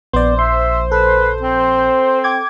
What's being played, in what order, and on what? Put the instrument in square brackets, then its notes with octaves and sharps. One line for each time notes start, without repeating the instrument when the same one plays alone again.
[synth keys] A#1 [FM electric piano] B3 D5 [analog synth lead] C5
[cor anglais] E5 [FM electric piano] C6
[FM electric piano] A4 [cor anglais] B4
[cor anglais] C4
[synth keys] G5 D6 G#6